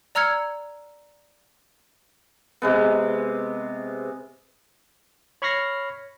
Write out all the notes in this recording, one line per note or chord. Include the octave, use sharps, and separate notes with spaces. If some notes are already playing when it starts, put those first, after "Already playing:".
D5 A#5 E6 F6 G#6 C#7
C3 G#3 B3
C#5 B5 C#6 F6 A#6 C7